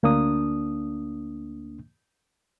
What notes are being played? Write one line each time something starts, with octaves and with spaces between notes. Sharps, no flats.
D2 A#3 D4 D#6